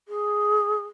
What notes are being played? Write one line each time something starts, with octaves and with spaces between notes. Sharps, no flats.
G#4